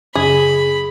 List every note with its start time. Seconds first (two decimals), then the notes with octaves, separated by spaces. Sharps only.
0.15 F#2 C#3 G#4 B5